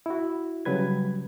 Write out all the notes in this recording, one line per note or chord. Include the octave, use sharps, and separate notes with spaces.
E4 F#4
C#3 F#3 G3 B4 G#6